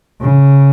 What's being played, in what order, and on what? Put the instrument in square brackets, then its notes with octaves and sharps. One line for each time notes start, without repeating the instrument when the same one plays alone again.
[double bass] C#3